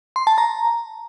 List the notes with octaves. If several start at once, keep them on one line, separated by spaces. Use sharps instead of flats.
C6
A5
A#5